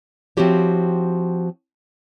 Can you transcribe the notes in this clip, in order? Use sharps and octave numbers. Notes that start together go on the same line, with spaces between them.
F3 C4 E4 F#4 G4 C#5